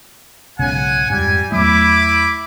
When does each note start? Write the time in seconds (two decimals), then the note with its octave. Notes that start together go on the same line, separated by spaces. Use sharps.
0.59 B1 G#2 C#3 F#5 G#5
1.10 F2 G#2 G3 G#5
1.52 E2 F#3 A3 E4 B5 D6